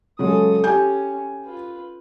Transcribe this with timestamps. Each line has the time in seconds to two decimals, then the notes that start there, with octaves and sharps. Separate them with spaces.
0.19 C#3 F#3 G#3 A4 D#6
0.64 C#4 G4 G#5 G6
1.45 F4 B4